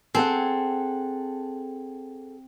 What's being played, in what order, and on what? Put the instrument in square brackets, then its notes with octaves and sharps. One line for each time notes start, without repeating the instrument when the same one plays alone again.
[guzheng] C4 [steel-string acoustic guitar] G#4 A4 F#5